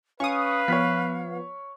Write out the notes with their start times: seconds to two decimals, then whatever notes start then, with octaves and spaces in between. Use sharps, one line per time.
0.20 C#4 B4 F5 C#6 D#6
0.68 F3 B3 C#5 F6 B6